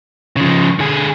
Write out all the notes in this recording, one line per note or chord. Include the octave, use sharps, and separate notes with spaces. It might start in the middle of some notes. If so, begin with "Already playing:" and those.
C#3 F3
D3 G#4